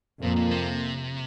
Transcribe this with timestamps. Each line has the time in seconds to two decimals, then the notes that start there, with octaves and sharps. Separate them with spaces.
0.22 F2 A#2 F3 A#3
0.36 A#2
0.51 C3